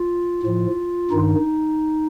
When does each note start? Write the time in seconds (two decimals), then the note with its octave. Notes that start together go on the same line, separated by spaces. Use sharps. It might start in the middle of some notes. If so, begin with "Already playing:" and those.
Already playing: F4
0.43 A2 F3
1.11 G2 D#3 D#4